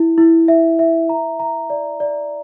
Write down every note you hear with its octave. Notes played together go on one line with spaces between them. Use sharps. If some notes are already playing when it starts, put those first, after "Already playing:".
Already playing: E4
E4
E5
E5
A#5
A#5
D5
D5